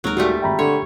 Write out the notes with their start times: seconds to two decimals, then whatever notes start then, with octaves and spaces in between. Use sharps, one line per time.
0.04 D#1 F#3 G#3 D#4 A#4
0.17 A#2 G3 A3 F#4
0.42 G#1 G#3 E5 G5 A#5 B5
0.59 D3 C#5 C6